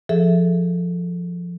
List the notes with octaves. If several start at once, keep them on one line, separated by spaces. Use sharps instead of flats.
F3 G#4 A4 E5